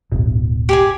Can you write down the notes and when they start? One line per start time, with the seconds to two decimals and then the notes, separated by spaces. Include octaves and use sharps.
0.12 D1 G1 B2
0.69 G4 G#4 G#5